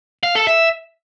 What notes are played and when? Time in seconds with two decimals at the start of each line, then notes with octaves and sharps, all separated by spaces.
0.23 F5
0.35 A4
0.47 E5